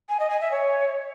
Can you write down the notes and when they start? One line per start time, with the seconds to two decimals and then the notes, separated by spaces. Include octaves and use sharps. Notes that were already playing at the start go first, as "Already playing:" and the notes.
0.09 G#5
0.20 D#5
0.30 G#5
0.41 E5
0.51 C#5